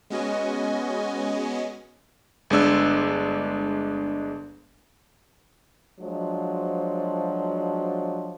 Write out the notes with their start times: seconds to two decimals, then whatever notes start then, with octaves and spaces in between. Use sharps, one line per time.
0.10 G#3 B3 C#4 F#4 D#5 G#5
2.50 G1 G#3 D4 E6
6.00 F3 F#3 G#3 D4 F#4 C5